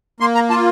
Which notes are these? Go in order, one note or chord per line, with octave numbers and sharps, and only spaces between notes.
A#3 C6
A#5
F4 A5